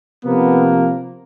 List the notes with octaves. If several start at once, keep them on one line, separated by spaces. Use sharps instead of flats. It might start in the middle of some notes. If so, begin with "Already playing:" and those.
C3 F3 A#3 B3